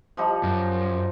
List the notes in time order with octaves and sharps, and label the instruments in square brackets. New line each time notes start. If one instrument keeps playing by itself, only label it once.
[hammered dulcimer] F3 G3 D#4
[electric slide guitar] F#2